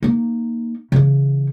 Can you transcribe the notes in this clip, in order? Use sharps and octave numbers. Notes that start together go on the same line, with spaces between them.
A#3 D#4
C#3 E3